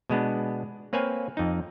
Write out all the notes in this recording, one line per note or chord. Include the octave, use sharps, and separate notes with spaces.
B2 G#3 B3 D4
A#3 C4 B4 C#5 F5 G#5
F2 D#4